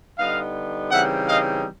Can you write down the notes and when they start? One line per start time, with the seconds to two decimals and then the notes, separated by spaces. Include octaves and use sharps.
0.18 D3 G3 B3 D#4 D#5 F5
0.92 C#3 E3 G3 C4 D#4 E5 F#5
1.29 D#5 F5